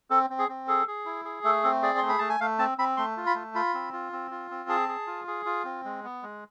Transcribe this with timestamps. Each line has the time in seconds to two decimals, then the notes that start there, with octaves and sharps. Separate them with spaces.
0.10 C4 A4
0.30 C4
0.39 G#4
0.49 C4
0.67 G#4 A4
0.87 G#4
1.06 E4
1.25 G#4
1.44 A3 A4
1.64 C4 A4
1.82 G#4 D5
1.98 A3 C6
2.09 B5
2.18 A3 A5
2.29 G#5
2.40 A3 F5
2.59 C4 A5
2.78 C4 B5
2.97 A3 C6
3.17 F4
3.27 B5
3.35 A3
3.55 F4 B5
3.74 C4
3.93 F4
4.12 C4
4.31 F4
4.51 C4
4.69 G#4 A5
4.88 G#4
5.07 F4
5.27 G#4
5.46 F4
5.65 C4
5.85 G#3
6.04 B3
6.23 G#3